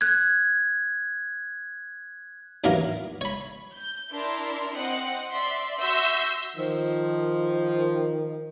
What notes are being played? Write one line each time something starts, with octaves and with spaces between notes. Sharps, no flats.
F#6 G#6
A1 D#2 E3 F#3 A#3 A#4
C#5 B5
G6
D4 E4 A#4 C6
C4 D#5 F#5
D5 E5 C6
F#4 E5 C6 E6 G6 A#6
D#3 F3